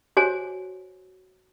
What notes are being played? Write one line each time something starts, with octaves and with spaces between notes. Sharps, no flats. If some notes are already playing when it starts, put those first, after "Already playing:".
F#4 C5 C#5 G#5